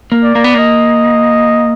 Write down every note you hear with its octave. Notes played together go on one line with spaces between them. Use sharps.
A#3
D5
A#3
B3
A#3 D#5